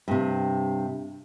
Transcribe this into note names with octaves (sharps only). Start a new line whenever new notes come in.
G2 C3